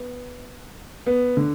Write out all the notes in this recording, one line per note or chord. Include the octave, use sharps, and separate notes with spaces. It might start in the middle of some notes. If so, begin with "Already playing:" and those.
Already playing: B3
B3
D3